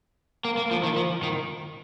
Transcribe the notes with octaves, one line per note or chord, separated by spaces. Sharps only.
A#3
A#3
F3
D#3
F3
D#3